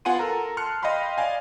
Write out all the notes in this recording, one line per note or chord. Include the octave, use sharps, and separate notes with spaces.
B3 F4 F#5 G#5 C6 D#7
A4 A#4 A#5
A5 C6 F6 F#6 C#7
D#5 F5 G5 B5 C6
D5 D#5 F5 G#5